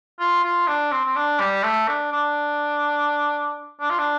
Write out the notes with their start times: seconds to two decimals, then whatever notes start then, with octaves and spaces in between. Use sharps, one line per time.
0.19 F4
0.43 F4
0.67 D4
0.92 C4
1.05 C4
1.16 D4
1.40 G3
1.63 A3
1.88 D4
2.12 D4
3.80 D4
3.90 F4
3.99 D4